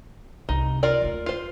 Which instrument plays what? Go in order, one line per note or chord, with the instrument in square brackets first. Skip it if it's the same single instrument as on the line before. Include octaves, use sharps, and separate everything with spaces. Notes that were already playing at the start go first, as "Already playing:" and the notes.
[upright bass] C2 [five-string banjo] D#4
[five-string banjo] F4 A#4 D5
[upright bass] D#2 A3
[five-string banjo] F4 C5